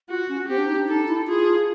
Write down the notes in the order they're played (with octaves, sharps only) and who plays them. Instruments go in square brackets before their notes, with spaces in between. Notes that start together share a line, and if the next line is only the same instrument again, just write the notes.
[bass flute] F4 [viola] F#4
[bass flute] C#4
[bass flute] C4 [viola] G4
[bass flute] D4
D#4
D4
[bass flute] D#4 [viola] A4
[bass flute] E4
[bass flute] F4 [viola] G#4